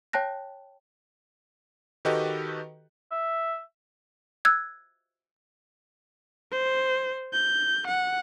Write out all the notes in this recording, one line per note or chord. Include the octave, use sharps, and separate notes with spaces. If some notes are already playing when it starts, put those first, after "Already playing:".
C#5 G5 A5 F#6 A#6
D#3 F#4 G4 A4 B4 D#5
E5
E6 F#6 G#6
C5
G6
F#5